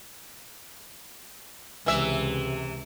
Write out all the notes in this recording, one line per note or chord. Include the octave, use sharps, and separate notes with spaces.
C#2 C3 E3 E5